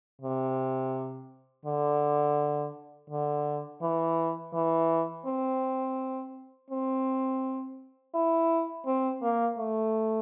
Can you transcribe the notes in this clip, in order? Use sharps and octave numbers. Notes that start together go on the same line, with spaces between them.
C3
D3
D3
E3
E3
C4
C4
E4
C4
A#3
A3